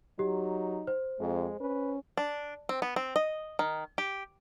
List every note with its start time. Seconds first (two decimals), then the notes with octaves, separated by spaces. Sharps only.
0.19 F#3 D#4 G4
0.87 C5
1.20 F2 G#3
1.60 C#4 B4
2.17 D4
2.69 C4
2.82 B3
2.96 C4
3.16 D#5
3.59 D#3
3.98 G4